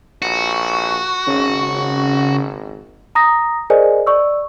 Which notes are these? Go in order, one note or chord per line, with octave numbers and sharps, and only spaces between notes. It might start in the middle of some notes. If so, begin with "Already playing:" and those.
A#1 F#4
G#1 C#3
A#5 D#6 A#6
G#4 A#4 C5 D5 D#5 G#5
D5 C#6 E6